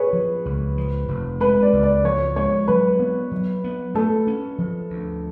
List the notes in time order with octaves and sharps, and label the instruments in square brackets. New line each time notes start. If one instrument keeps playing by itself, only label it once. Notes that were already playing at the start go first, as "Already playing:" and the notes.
Already playing: [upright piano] G#4 B4 C#5
[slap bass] F3
C#2
F3
F1
[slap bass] G#3 [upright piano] B4
[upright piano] D5
[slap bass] C#2
[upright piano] D5
[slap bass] F3 [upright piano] C#5
[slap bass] G#3 [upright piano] C#5
[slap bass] F#3 [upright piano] B4
[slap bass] B3
F#3
B3
[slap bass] A3 [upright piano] A4
[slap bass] C#4
F3
D2